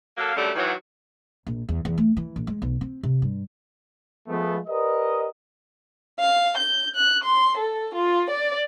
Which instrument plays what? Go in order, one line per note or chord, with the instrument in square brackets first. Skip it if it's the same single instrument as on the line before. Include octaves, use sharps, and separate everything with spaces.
[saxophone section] F#3 A#3 A4 F5
F#2 D3 F#3 G3 A3
D#3 E3 F#3
[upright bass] A#1
E2
E2
A3
E3
A#1
G#3
B1
C4
C3
G2
[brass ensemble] F3 G#3 A3 B3
G4 A#4 B4 D5 D#5
[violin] F5
G6
F#6
C6
A4
F4
D5